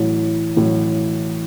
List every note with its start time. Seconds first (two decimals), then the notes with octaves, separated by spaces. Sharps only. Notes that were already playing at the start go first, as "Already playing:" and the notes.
Already playing: A1 A2 F#3
0.56 A1 A2 F#3